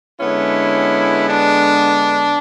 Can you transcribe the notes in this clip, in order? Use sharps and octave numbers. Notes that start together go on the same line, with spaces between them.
D3 G#3 B3 C#4 E4
D4